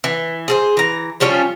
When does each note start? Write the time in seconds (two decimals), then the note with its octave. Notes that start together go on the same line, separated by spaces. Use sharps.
0.04 E3
0.48 G#4 A4 C5
0.77 E3 A#5
1.20 F3 G3 C#4 F4